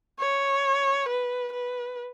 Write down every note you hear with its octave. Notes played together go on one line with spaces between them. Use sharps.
C#5
B4
B4